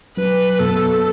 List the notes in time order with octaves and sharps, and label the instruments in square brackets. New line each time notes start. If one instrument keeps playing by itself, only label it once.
[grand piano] F#3 [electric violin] B4
[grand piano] B2 [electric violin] A4